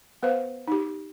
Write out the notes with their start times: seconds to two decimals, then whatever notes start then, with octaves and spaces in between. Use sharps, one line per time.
0.23 B3 B4 C5 F5
0.68 D#4 G4